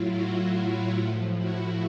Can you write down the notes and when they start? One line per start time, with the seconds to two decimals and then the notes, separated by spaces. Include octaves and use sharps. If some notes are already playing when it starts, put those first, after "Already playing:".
Already playing: A2 F#3 E4 F4
0.12 E4 F#4
0.54 E4
0.96 A2 F3
1.39 E4 F#4